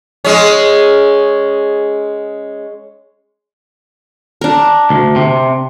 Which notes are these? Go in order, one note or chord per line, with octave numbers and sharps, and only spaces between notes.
G#3 C#4
D4 A#4
D2
C3